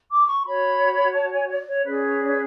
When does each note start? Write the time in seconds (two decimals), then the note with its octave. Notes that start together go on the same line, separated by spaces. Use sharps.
0.10 D6
0.27 C#6
0.45 F#4 C#5 B5
1.14 A5
1.32 G#5
1.49 D5
1.67 C#5
1.85 C#4 G#4 B4 D5
2.03 C#5
2.20 D5